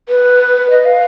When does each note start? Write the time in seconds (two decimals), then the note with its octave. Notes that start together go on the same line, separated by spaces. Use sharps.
0.09 B4
0.70 D#5
0.85 F5